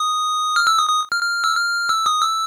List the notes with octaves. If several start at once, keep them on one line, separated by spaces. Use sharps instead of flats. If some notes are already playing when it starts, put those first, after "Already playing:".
Already playing: D#6
F6
E6
D#6
D#6
F6
F6
E6
F6
E6
D#6
E6